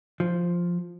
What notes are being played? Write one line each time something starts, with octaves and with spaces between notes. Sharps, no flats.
F3